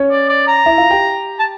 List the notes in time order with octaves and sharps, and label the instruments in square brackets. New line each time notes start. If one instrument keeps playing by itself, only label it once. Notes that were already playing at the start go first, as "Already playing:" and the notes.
Already playing: [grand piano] C#4 C#5
[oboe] D5
D5
A#5
[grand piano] E4 E5
F4 F5
G4 G5
[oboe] A5